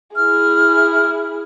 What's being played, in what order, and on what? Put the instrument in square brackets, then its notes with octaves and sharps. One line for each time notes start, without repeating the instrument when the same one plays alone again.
[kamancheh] E4 G#4 [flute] F6